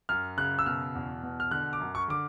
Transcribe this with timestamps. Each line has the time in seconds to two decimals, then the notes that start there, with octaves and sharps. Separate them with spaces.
0.09 F#2 F6
0.37 C#3 F#6
0.59 E6
0.66 B2 F6
0.95 E2
1.23 B2
1.40 F6
1.51 D3 F#6
1.73 D6
1.80 F#2
1.95 C#6
2.08 D3 D6